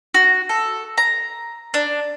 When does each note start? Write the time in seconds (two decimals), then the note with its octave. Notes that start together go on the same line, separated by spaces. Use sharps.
0.14 F#4
0.49 A4
0.98 A#5
1.74 D4